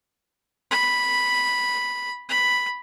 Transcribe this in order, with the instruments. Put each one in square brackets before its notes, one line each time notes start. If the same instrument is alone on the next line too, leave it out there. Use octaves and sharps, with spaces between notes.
[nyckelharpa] B5
B5